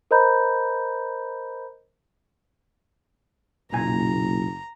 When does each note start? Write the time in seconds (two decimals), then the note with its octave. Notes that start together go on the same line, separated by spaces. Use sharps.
0.11 A#4 C5 D#5 A#5 B5 G6
3.73 F#1 B1 A#2 G#5 A#5